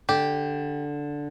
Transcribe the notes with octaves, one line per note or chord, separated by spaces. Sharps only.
D3 G4